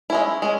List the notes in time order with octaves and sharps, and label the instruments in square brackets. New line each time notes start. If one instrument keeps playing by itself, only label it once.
[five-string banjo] G#3 C#4 E4
G#3 C#4